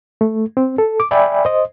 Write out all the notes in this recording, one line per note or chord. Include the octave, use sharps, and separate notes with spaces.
A3
C4
A4
D6
D5 E5 G5 G#5 B5
C5 D#5